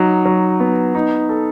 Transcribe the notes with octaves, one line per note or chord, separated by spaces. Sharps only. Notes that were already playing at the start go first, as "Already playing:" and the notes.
Already playing: F#3 D#4
F#3
B3
D#4
A4